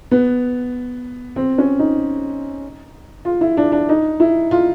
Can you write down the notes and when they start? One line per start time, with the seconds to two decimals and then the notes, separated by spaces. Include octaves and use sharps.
0.11 B3
1.36 C4
1.58 C#4
1.79 D#4
3.25 F4
3.41 E4
3.57 D4
3.72 D4
3.89 D#4
4.20 E4
4.51 F4